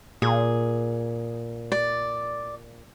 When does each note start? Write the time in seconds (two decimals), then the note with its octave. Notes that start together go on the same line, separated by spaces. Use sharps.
0.22 A#2 G#4
1.72 D5